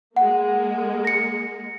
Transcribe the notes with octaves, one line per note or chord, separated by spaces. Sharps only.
G#3 A#3 F#5
A#6 C#7